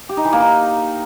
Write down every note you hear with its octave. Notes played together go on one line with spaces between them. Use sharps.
G4
D#4
E3
A#3
D#4